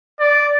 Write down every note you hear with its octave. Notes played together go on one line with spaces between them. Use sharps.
D5